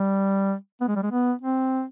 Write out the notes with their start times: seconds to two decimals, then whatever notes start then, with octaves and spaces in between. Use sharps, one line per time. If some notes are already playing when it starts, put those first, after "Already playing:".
Already playing: G3
0.81 B3
0.88 G#3
0.96 G3
1.03 G#3
1.11 B3
1.42 C4